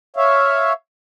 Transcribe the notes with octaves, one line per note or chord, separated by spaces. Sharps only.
C#5 E5 F5